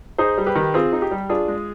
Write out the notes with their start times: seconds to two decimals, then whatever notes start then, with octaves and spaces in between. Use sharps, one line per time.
0.18 D#4 G#4 C5
0.38 G3
0.46 G4 B4
0.55 D#3
0.74 C4 F4 G#4
0.93 D#4
1.02 G4
1.11 G3
1.29 D4 F4 G#4
1.48 G#3